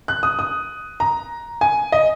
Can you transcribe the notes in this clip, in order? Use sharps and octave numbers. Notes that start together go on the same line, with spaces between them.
F#6
D#6
D#6
A#5
G#5
D#5